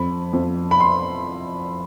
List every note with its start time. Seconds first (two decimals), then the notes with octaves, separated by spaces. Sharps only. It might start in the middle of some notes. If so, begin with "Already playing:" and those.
Already playing: F2 B5
0.33 F2
0.71 B5
0.80 C6